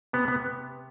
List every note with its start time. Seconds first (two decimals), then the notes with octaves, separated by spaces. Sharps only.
0.13 C3 B3
0.28 B3